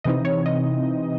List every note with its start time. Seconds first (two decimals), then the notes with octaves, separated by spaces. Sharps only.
0.04 C3 E3 C4 D#4 D#5
0.25 C#5
0.46 D#5